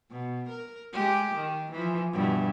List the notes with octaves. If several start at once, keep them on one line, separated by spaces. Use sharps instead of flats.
B2
A#4
G#3 G4
D#3
E3 F3
G2 B2 E3